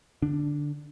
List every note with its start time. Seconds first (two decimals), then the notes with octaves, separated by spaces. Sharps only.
0.22 D3 D4